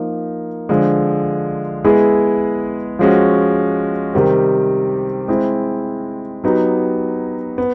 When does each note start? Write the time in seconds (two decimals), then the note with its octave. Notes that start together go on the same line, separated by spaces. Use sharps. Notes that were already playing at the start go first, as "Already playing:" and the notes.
Already playing: F3 A#3 D#4
0.69 D3 F3 G#3
1.84 G#3 B3 E4 G#4
2.99 F3 G#3 C#4 F#4
4.14 C3 D#3 G3 C4
5.28 G#3 C4 E4
6.44 F#3 B3 D#4 G4
7.58 B3